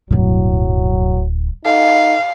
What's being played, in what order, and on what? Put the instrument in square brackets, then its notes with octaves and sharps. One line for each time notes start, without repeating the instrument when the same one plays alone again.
[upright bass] D1 E4 [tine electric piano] C#2 G2 B2 [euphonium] F#3
[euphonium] D#4 [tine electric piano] A4 F#5 [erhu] F5